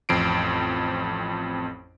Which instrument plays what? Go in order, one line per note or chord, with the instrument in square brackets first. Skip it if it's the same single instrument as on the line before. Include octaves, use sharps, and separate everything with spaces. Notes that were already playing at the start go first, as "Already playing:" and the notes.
[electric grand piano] A1 F2 C4 C7 D7